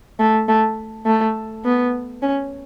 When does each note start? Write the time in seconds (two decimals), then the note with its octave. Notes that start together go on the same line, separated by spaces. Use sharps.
0.19 A3
0.48 A3
1.06 A3
1.65 B3
2.22 C#4